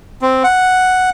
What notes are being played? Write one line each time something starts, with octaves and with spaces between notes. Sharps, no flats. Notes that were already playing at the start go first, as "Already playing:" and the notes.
C4
F#5